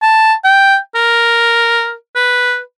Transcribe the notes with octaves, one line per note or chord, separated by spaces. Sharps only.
A5
G5
A#4
B4